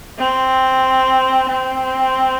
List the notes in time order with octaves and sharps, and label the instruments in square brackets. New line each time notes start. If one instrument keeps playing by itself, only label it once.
[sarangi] C4
C4